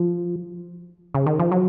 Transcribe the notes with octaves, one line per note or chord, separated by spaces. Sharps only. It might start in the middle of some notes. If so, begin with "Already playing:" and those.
Already playing: F3
C#3
D#3
F3
F#3